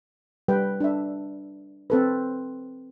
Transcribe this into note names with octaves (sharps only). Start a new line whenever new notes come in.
G3 B4 G5
D4 E5
C4 A4 B4